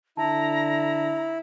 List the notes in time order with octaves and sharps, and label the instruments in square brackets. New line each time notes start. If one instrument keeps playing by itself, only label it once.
[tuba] D3 [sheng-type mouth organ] E4 [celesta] A5 [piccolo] A#5